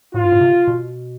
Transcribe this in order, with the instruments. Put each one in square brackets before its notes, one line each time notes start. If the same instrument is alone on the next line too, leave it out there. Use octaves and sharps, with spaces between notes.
[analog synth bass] A2 [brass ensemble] F4
[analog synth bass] G2
A2
C3
B2